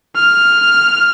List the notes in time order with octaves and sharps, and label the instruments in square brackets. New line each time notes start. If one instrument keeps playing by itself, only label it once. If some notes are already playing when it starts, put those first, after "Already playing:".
[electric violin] F6